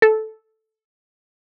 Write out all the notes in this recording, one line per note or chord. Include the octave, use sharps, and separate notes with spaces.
A4